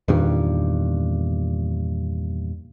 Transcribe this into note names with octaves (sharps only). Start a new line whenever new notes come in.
E2 G2 A#2 D#3